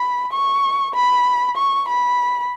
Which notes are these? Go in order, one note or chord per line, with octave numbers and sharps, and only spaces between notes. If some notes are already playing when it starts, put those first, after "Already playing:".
Already playing: B5
C#6
B5
C#6
B5